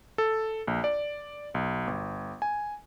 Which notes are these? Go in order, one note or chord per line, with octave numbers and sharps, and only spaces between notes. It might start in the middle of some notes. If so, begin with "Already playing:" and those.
A4
A#1
D5
B1
G1
G#5